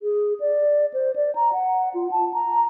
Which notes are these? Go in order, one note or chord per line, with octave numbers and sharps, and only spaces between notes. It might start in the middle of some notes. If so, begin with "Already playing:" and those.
G#4
D5
C5
D5
A#5
F#5
F4
A5
A#5